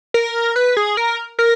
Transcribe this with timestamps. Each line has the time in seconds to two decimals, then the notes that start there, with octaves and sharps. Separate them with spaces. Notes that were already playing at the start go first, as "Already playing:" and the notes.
0.14 A#4
0.56 B4
0.77 G#4
0.97 A#4
1.39 A#4